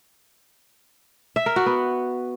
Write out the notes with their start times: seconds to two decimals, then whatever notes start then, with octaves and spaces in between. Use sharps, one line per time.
1.36 E5
1.46 A#4
1.56 F#4
1.66 B3